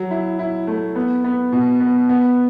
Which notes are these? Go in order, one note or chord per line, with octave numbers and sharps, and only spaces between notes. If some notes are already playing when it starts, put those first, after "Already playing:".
Already playing: F#3
E4
E4
A3
B3
B3
B2
B3
B3